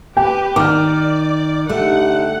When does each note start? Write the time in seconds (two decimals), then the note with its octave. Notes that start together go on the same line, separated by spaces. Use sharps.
0.17 G4 B4 G5
0.56 D#3 D5 D6 F6
1.69 D3 A3 D#4 G4 F#5